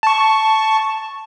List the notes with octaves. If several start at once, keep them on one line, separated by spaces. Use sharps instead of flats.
A5 C#6